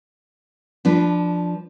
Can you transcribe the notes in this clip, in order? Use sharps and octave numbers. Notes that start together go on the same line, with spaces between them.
F3 D4 B4